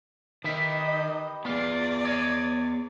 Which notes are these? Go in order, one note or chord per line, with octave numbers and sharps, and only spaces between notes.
D#3 G4 B4 D#5 E5
B3 F4 G#4 D5
C#5 D#5